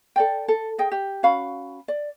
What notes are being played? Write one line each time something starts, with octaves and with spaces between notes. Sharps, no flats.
A4 D5 G5
A4
G#4 D#5 G5
G4
C#4 F#4 F5 B5
D5